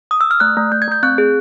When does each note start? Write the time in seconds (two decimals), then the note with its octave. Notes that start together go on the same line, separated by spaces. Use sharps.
0.11 D#6
0.21 E6
0.31 F6
0.40 A3 F#6
0.57 A3
0.72 A3 G6
0.82 G#6
0.88 A3 G6
1.03 C4 F#6
1.18 G#4